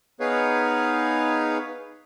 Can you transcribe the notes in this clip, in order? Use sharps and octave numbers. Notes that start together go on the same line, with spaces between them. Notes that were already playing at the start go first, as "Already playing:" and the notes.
B3 D#4 G#4 B4 C#5 F5